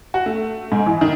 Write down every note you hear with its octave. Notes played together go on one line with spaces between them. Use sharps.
F#4
A3
G#2
E3
D#3